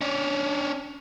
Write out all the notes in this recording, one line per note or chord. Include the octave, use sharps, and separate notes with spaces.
C#4 D4